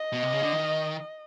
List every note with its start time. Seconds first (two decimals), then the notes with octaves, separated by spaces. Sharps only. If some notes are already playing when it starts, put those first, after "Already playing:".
Already playing: D#5
0.12 B2
0.23 C3
0.33 C#3
0.43 D3
0.53 D#3